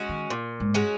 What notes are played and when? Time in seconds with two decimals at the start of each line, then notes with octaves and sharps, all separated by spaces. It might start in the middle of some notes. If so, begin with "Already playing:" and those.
Already playing: G#3 C#4 F#4
0.09 D#3
0.30 A#2
0.60 G#2
0.74 G#3 C#4 F#4